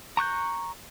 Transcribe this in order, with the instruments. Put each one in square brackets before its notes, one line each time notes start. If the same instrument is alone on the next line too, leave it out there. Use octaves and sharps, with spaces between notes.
[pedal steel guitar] A#5 C#6 F#6 G6